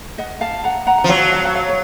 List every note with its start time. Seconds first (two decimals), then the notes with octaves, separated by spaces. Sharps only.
0.18 D#5 F#5
0.41 F5 A5
0.64 F#5 A#5
0.87 F#5 A#5
0.98 F#5
1.04 F3
1.09 F#3 F5 A5
1.32 F5 A5
1.45 F#5
1.54 C#5 F5
1.69 C#5